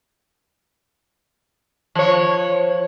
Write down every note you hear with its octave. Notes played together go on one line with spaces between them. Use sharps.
F3 C#5